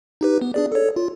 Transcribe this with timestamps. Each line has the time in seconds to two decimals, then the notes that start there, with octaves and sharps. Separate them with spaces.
0.21 D#4 G4 B4
0.41 B3
0.54 D4 G#4 D5
0.72 A4 C#5
0.96 F4